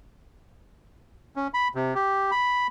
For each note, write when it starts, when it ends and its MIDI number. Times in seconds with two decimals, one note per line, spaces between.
1.36 1.48 61
1.54 1.68 83
1.75 1.94 48
1.95 2.31 67
2.31 2.67 83